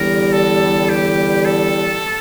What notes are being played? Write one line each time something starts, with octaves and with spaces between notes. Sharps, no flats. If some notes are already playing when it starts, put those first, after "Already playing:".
Already playing: E2 D3 G3 A#4
A4
G4
A4